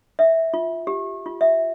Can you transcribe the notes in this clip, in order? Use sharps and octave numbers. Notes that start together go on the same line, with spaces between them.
E5
F4
G4
F4
E5